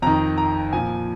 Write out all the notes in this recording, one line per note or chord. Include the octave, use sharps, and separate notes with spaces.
F2 D#3 A#5
A#5
A#2 F3 G#5